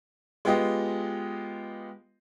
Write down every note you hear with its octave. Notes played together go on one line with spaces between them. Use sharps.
G#3 B3 F4 G4 D#5